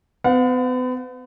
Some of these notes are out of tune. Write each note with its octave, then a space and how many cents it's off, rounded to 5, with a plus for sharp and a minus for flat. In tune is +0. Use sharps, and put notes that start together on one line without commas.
B3 +40 F#5 -45